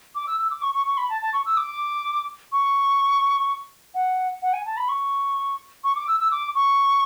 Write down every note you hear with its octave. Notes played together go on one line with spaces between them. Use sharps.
D6
E6
E6
D6
C#6
C#6
C#6
B5
A5
A5
C#6
E6
D6
C#6
F#5
F#5
G#5
A5
B5
C#6
C#6
D6
E6
E6
D6
C#6